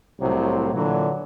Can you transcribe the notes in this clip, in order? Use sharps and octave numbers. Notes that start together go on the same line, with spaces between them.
C2 A2 C3 F#3 C5
A#2 D3 E3 F#3